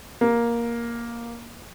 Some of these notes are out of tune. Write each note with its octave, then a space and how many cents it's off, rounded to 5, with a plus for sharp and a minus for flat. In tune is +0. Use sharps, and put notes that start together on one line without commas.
A#3 +10